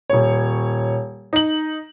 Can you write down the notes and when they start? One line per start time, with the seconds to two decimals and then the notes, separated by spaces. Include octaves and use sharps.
0.10 D#1 C#5
1.33 D#4 F#7